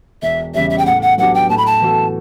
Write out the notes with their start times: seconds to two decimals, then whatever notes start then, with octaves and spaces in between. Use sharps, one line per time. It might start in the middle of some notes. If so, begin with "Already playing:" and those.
0.22 E1 E5
0.54 E2 C#3 G3 C#4 E5
0.70 E5
0.78 G5
0.86 A2 F#5
1.02 F#5
1.18 F#3 B3 D4 G4 F#5
1.34 G5
1.49 A2 A5
1.57 B5
1.66 A5
1.82 E3 B3 F#4 A4